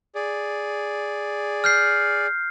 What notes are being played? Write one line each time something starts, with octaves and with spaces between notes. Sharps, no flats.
G#4 D5
F6 G6 C7